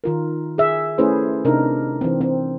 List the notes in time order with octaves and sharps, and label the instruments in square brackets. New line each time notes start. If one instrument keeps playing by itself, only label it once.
[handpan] D#3 F4 A#4
G#4 E5
A3 C#4 E4 G#4 B4 C5
C3 D4 D#4 A#4
E3 C4
C4